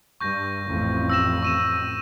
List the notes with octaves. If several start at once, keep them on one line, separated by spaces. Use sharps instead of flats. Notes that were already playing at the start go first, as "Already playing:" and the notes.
G2 C#6 G6 A#6
A1 F2 A2
E6 A#6 E7
C#6 D#7 E7